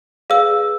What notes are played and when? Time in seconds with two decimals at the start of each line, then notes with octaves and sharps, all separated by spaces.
0.30 G#4 B4 D5 F5 E6